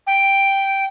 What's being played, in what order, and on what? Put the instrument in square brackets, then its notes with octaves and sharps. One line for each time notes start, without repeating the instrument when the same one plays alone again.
[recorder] G5